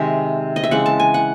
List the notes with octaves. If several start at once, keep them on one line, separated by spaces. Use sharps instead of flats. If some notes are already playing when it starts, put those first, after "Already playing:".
Already playing: C3 D#3 G#3 C4 E5
D#5
E5
C#3 E3 G#3 C4 F#5
A5
G#5
F#5